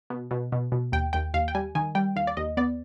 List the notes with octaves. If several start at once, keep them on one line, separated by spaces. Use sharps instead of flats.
B2
B2
B2
B2
D#2 G5
D#2 G5
D#2 F5
G5
G3 G#5
D#3 G#5
G3 G5
D#2 F5
D5
D#2 D#5
B3 D5